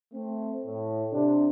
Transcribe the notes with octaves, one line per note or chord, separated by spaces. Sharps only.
A3 C4
A2
C3 D4